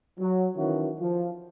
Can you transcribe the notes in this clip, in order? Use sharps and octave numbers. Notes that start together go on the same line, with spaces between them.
F#3
D#3 E3 C#4 E4 F#4
F3